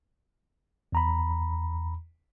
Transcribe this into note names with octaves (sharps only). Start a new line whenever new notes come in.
E2 A#5 B5